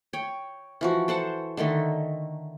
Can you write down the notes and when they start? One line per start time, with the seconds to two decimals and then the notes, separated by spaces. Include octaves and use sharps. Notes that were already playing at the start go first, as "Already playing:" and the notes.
0.13 C#5 G5
0.81 E3 F3 F#4
1.08 A4 C5 F#5 A5
1.57 D3 D#3 A3 D#4